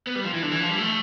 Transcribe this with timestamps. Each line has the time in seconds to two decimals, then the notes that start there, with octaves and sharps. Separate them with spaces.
0.07 B3
0.16 G3
0.24 F3
0.33 E3
0.42 D3
0.52 E3
0.61 F3
0.70 G3
0.78 A3